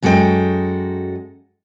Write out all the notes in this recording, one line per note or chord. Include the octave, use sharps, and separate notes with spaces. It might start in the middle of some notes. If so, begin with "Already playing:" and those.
F#2 G#3 F#4 A4 D#5 G5